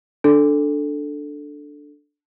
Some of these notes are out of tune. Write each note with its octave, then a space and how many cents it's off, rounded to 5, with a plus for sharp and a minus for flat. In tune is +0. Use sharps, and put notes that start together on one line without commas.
D4 +0 A4 +0